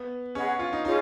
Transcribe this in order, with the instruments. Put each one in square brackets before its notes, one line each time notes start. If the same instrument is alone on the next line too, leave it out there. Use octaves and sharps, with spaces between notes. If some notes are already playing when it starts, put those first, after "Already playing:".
Already playing: [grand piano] B3
[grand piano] C#4 [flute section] G#4 D#5 F#5 B5
[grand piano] F4
D#4
[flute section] C#4 F4 G#4 C#5 [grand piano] D#4